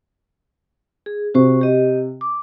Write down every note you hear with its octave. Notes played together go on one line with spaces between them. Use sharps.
G#4
C3 F#4 C5 C#6
G4 D#5
D6